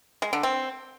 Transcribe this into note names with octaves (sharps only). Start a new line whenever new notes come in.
G#3
D3
C4